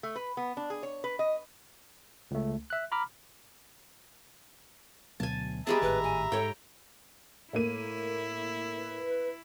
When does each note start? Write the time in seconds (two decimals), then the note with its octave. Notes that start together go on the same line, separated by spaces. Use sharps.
0.03 A3
0.16 B4
0.37 B3
0.57 D4
0.70 G#4
0.83 C#5
1.04 B4
1.19 D#5
2.31 C#2 A3
2.70 E5 F#6
2.92 A#5 B5 D6 F6
5.20 D2 B2 F#3 G#5 A5
5.67 G3 G#3 B3 G#4 E5 A5 A#5
5.81 G#1 A2 D#3 B4
6.03 G#5
6.32 G#2 A4 C#5 G5
7.53 A2 A#3 E4 D#7
8.77 B4